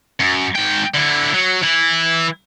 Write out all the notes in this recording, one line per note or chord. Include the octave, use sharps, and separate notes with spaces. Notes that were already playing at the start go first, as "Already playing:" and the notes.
F#2
G#2 G5
D3 E4
F#3
E3 E4